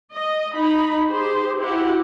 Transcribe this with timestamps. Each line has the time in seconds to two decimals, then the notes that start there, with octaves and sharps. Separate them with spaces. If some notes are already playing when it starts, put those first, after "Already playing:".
0.13 D#5
0.54 D#4 B5
1.07 G4 G#4 C5
1.57 E4 F#4 G4 F#5